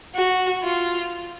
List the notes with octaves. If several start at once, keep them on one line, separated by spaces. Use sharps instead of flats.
F#4
F4